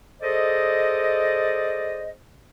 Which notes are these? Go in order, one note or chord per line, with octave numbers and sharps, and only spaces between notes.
G#4 A4 C5 D5 D#5